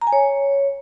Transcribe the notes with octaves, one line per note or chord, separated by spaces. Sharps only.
A#5
G#5
C#5